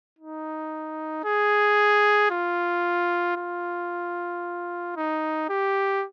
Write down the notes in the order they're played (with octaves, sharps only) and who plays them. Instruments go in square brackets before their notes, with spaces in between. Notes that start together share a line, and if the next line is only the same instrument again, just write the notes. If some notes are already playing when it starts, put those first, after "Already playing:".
[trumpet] D#4
G#4
F4
F4
D#4
G4